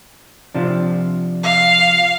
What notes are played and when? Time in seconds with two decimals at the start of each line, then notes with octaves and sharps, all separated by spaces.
0.55 C3 F3 D4
1.43 F5